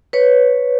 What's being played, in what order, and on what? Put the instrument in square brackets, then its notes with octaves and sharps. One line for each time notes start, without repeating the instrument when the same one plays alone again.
[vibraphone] B4 C#5